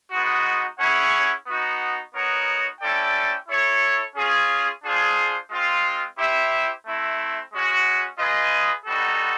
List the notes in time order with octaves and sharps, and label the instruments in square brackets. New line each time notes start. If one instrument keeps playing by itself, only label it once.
[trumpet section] G#3 B3 D#4 F#4
C#4 E4 G#4 C#5 F#5
B3 D#4 F#4
B3 D#4 F#4 A#4 C#5
C#4 E4 A4 D5 G5
E4 A4 C#5
C#4 F4 G#4
D4 F4 G#4 C5
G#3 C4 F4
E4 G4 C5 E5
A3 C4 E4
G#3 C#4 F#4
F4 G#4 B4 D#5
G3 B3 D#4 F#4 A4